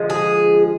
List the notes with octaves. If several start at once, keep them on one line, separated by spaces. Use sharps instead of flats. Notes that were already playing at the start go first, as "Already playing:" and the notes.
Already playing: D3 F3 G#3
G#4